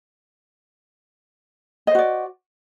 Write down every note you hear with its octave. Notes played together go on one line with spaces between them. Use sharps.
F#4 C5 D5 D#5